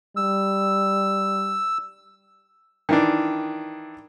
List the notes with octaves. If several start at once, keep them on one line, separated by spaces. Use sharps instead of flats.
G3 E6
D#3 E3 D4